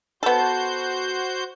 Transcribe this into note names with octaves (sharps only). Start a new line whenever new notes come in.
B3 F#4 A4 C5 G6